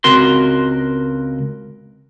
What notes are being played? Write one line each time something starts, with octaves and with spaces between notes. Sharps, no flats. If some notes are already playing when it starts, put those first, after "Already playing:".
C#2 C4 F#4 A#4 C6